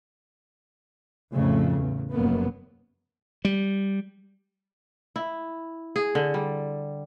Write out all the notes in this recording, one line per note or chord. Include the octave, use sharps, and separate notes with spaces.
F2 A2 C#3 A3
E2
F1 F#2 A#3 B3
G3
E4
G#4
D3
G3